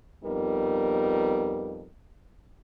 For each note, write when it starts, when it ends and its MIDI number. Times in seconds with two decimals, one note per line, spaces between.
0.25 1.87 41
0.25 1.87 55
0.25 1.87 59
0.25 1.87 63
0.25 1.87 70